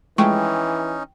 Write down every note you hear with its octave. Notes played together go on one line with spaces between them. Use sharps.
E3 F3 G#3 A3 C#4 D#4 G5 C#6